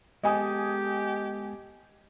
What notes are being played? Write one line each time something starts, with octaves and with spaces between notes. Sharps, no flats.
G#3 B3 G4 A4 D#5 G#5 D#6